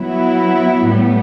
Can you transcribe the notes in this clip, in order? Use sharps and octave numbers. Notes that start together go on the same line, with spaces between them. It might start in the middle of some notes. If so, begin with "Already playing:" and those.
Already playing: F#3 B3 E4
A2 G3 B3